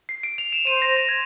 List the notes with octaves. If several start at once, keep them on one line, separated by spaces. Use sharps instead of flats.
C7
D7
F7
E7
C5 D#7
A#6
A#6
G#6